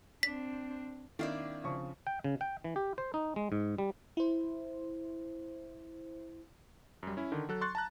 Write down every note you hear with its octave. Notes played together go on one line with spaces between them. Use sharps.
C4 D4 B6
D#3 A#3 C4 D4 E4 D5
C#3 F3 C#6
G5
C#3
G5
E3
G4
C5
D#4
G#3
G#2
G3
E4 C5
F#2 G3
C#4 E4
D3 D#3
F#3 A4 F#6
C6 C#6 F#6 A6
A5 A#5 F#6